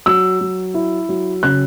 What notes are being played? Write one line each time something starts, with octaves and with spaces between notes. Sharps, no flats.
F#3 E6
F#3
E4
F#3
C#3 F#6